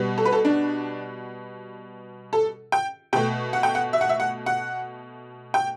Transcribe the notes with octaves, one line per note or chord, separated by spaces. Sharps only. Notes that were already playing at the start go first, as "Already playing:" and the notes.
Already playing: B2 G3 B3
A4
B4
A4
D4
A4
G5
B2 A3 G5
F#5
G5
F#5
E5
F#5
E5
F#5
F#5
G5